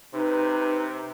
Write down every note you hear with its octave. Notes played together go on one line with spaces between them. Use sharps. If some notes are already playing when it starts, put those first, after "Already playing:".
C3 D#4 B4